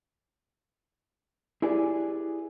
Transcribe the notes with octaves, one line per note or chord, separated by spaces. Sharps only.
E4 G4 G#4 B4 D5